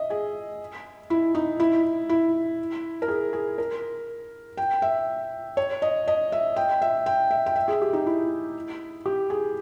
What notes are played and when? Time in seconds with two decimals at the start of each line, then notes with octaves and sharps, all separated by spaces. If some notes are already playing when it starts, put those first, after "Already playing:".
Already playing: D#5 E5
0.10 G#4
1.10 E4
1.35 D#4
1.60 E4
2.09 E4
3.02 A#4
3.08 G#4
3.33 G#4
3.58 A#4
4.57 G5
4.82 E5
5.57 C#5
5.82 D#5
6.08 D#5
6.32 E5
6.56 G5
6.82 E5
7.06 G5
7.31 E5
7.46 G5
7.56 E5
7.68 G#4
7.82 G4
7.93 D#4
8.06 E4
9.06 G4
9.30 G#4